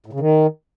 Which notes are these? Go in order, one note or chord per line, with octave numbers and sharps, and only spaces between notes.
A2
C#3
D#3